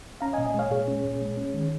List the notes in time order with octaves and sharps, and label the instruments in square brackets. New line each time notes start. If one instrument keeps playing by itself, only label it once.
[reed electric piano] C#4 F5 A#5
D#5 G#5
A#2
D#5 G#5
G#3 C#5 F5
A#2 G#4 C#5
C#4
A#2
G#3
C#4
D#3